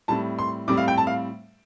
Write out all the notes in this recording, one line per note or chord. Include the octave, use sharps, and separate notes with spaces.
A2 G3 C4 A5
C6
A2 G3 C4 D6
F5
G5
A5
F5